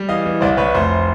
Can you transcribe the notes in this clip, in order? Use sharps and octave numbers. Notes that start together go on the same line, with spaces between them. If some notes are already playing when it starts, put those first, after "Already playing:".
Already playing: G3
E3 D#5 F5
E3
C2 C5 D5
C2 B4 C#5
F1 C5